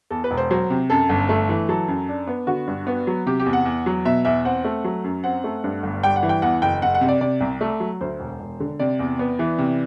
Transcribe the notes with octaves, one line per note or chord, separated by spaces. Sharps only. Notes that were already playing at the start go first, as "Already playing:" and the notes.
E2 A4
B4
E1
C5
F#3 C5
C3
F#2 A4
G1
A3
E3
F#3 A4
F#2
D4
B3
D3 F#4
G2
B3
F#3
C3 G4
G4
E2
F#5
E2
F#3
B2 E5
E2 E5
C4 F#5
A3
F#3
F#2
C4 F#5
A3
G2
G1
G3 G5
F#5
E3
G5
E2 F#5
F#1 G5
F#1 F#5
F#5
C3
D5
C3 D5
C2
A3
F#3
D2 C5
E1
E1
D3
C3 D5
E2
B3
E3
C3